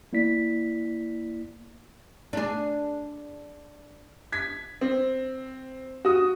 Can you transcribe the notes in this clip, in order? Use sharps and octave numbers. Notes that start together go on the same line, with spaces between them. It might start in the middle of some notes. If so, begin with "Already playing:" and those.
A#3 E4 D5 B6
D4 G#4
G#6 B6
C4
F#4 D#6